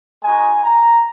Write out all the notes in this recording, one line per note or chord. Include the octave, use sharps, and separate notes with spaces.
G#3 D#4 F#4 G#5
A#5